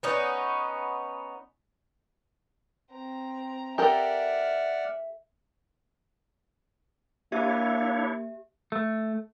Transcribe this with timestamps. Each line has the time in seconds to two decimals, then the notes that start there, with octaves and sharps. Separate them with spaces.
0.03 B3 C#4 D#4
2.92 C4 A#5
3.78 G4 A4 A#4 D5 E5 F#5 F6
7.32 A#3 D4 E4 G4 C#5 E5 F5
8.72 A3